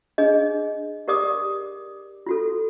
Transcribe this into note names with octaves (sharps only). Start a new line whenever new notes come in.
D4 G#4 D#5
G4 A#4 D5 D6 D#6
F4 F#4 A4